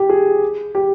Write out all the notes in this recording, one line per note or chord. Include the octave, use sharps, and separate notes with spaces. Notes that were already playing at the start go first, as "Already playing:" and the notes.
Already playing: G4
G#4
G4